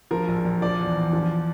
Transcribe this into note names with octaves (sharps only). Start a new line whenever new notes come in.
F3 A#4
A#1
A#1
F3 D5
E2
E2
F3